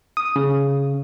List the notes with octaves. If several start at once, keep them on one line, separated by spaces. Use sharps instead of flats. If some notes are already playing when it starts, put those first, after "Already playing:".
D#6
C#3